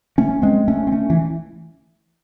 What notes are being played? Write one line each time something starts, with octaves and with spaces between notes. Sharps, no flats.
A3 C#4
G#3 C4
A3 C#4
C4
A3 C#4
E3